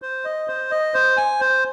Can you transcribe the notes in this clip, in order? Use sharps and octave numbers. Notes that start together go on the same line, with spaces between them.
C5
D#5
C5
D#5
C5
G#5
C5